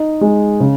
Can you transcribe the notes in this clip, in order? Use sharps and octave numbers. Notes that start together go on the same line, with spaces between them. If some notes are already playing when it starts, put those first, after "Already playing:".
Already playing: D#4
G#3
C#3